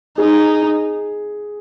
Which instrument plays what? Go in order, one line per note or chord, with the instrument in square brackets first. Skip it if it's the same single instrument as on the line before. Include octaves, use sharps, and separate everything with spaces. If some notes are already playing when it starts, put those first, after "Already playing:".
[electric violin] D#4 [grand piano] G#4